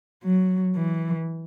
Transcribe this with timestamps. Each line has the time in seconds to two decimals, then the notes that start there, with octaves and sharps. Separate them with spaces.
0.24 F#3
0.76 E3